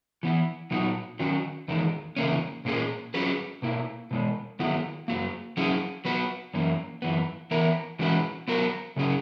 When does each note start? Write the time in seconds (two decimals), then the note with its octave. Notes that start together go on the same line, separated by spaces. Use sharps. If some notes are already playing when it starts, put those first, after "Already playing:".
0.23 E3 B3 E4
0.71 A#2 F#3 B3 D#4 F#4
1.19 D#3 F#3 C#4 F#4
1.68 E2 D#3 G#3
2.16 E2 C#3 E3 A#3 C#4
2.65 A#2 A#3 C#4 G#4
3.14 F#3 C#4 G#4 B4
3.62 B2 A#3 E4
4.11 B2 G#3 B3
4.59 D#3 F#3 B3 E4
5.08 F#2 D#3 F#3 A#3
5.57 F#3 C#4 E4 G#4
6.05 F#3 B3 F#4 B4
6.54 F#2 E3 A#3 C#4
7.02 F#2 E3 B3
7.51 E3 B3 E4 A#4
7.99 E3 G#3 C#4 F#4 B4
8.48 F#3 B3 F#4 A#4
8.96 C#3 F#3 C#4 G#4